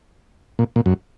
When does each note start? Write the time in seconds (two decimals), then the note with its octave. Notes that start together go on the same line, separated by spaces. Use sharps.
0.59 A#2
0.76 A#2
0.86 F#2